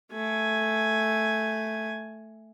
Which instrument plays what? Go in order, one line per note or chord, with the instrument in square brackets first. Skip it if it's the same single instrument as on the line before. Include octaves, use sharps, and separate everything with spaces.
[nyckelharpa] A3 G#5